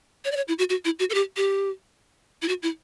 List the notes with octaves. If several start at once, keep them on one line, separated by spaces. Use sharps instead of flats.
C#5
D5
C#5
E4
F#4
F#4
E4
F#4
A4
G4
G4
E4
F#4
E4